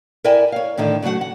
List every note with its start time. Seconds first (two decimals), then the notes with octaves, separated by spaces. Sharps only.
0.24 E4 A#4 D5 E5 G5 G#5
0.52 C#5 F5
0.78 A2 D3 D#3 D#4 E4
1.02 C#3 F#3 A3 F#4 F#5
1.21 F#5